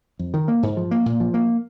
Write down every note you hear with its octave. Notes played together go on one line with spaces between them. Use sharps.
F2
D#3
A#3
G#2
F3
A#3
A#2
F3
A#3